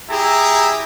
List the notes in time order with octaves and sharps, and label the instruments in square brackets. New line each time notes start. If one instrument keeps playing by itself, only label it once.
[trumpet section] E4 G4 G#4 E5 A#5